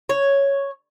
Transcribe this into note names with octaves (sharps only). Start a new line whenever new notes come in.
C#5